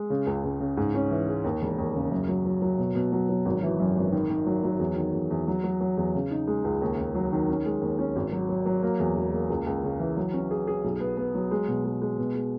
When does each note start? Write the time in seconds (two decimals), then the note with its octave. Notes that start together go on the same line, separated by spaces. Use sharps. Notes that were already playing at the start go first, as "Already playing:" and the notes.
Already playing: G#3
0.10 C#3
0.27 C#2
0.44 C#2
0.60 C#3
0.77 G#2
0.94 C#4
1.11 E3
1.28 G#3
1.44 D#2
1.62 E1
1.78 D#2
1.94 C#3
2.12 F#2
2.28 F#3
2.46 F#3
2.62 F#3
2.78 B2
2.95 B2
3.12 F#3
3.29 F#3
3.45 G#1
3.63 E3
3.80 F#2
3.96 G#1
4.12 D#3
4.30 D#3
4.46 F#3
4.63 F#3
4.79 E2
4.96 D#3
5.14 E2
5.31 E2
5.48 F#3
5.64 F#3
5.81 F#3
5.97 E2
6.14 C#3
6.31 D#4
6.47 G#3
6.64 C#2
6.82 D#2
6.98 D#2
7.15 F#3
7.32 D#3
7.49 C#4
7.66 G#3
7.81 D#2
7.99 C#4
8.16 G#1
8.32 F#3
8.49 F#3
8.66 F#3
8.82 A#3
9.00 E2
9.16 E1
9.33 A#3
9.50 C#2
9.67 C#2
9.83 C#3
10.00 E3
10.17 F#3
10.34 C#4
10.51 G#4
10.68 G#4
10.84 B1
11.00 B3
11.17 B3
11.35 F#3
11.51 G#3
11.68 B2
11.85 G#3
12.02 G#3
12.18 B2
12.35 G#3